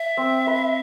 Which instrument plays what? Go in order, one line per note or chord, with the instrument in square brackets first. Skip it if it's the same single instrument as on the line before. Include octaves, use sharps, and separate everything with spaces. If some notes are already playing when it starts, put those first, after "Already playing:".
Already playing: [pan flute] E5
[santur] C4
B4